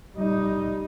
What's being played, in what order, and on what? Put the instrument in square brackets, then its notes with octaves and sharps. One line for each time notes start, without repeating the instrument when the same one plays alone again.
[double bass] G3 D#4